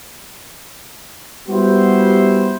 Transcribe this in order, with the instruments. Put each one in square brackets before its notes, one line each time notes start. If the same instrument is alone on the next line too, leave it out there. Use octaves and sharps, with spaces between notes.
[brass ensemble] G3 B3 E4 F#4 G4 C5